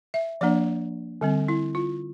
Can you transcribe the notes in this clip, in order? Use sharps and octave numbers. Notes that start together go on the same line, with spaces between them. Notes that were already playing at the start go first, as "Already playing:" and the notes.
E5
F3 A#3 D4 D5
D3 G3 C4
E4
F4